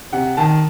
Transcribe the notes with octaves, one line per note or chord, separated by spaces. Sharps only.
C3 F#5
D#3 A5